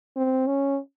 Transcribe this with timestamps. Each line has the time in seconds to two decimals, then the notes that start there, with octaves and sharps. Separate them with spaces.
0.16 C4
0.47 C#4